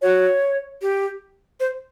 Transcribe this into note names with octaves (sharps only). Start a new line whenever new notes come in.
F#4 C#5
G4
C5